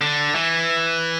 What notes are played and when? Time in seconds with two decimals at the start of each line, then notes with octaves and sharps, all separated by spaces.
0.01 D3
0.35 E3